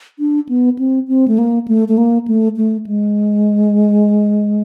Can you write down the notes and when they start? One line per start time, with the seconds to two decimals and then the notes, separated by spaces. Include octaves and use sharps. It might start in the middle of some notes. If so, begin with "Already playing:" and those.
0.19 D4
0.49 B3
0.79 C4
1.08 C4
1.28 A3
1.38 A#3
1.68 A3
1.88 A3
1.98 A#3
2.28 A3
2.57 A3
2.87 G#3